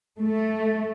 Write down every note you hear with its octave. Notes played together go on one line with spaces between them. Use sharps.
A3